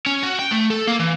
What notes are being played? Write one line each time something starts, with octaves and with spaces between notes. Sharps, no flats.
C#4
F#4
G5
A3
A4
A#3
E3